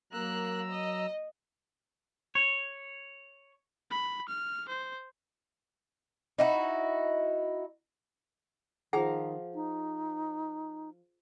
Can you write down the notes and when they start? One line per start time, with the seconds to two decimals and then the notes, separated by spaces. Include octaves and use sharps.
0.12 F#3 A#3 A#5 E6 F#6
0.69 D#5
2.35 C#5
3.91 B5
4.29 F6
4.69 C5
6.38 D#4 E4 F#4
8.93 D#3 F3 G#4 F5 F#5 A#5
9.54 D#4